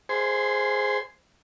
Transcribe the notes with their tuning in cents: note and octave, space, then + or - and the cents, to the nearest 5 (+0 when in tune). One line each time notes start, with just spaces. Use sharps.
G#4 +0 C5 +0 C6 -30